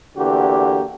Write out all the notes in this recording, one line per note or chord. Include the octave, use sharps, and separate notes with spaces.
E2 D3 A#3 F#4 G4